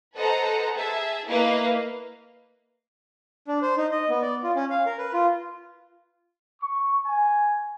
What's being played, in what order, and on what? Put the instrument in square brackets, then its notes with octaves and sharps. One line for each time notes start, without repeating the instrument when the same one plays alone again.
[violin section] A4 B4 C5 D#5 F#5 A#5
G#4 E5 A5
A#3 E4 A#4 B4 D#5 F5
[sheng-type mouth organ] D4
C5
D#4
D#5
B3
D5
F4
C#4
F5
A#4
B4
F4
[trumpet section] C#6
G#5